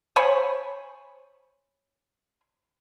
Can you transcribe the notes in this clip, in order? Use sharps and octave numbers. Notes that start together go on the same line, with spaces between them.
C5 C#5 G#5 B5